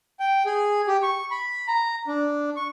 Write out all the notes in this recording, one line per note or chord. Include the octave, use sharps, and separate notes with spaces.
G5
G#4
G4
C#6
B5
A#5
D4
C#6